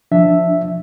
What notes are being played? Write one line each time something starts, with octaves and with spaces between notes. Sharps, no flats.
F3 D4 E5